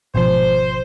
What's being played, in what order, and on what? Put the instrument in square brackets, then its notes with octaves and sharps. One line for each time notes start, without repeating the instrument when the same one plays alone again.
[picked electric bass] G#1 B2 F3 [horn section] C5